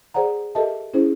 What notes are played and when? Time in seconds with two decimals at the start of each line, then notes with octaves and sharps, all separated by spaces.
0.14 G#4 C5 D5 F#5 A#5
0.55 G4 A4 A#4 D#5 E5 A5
0.94 C#4 E4 G#4 C5